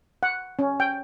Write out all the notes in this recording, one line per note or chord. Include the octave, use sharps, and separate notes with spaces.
F#5
C#4
G5